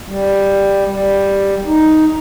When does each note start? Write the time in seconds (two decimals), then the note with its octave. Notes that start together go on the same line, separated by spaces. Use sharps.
0.08 G3
0.87 G3
1.66 D#4